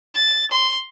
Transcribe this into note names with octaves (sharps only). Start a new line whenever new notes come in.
A6
C6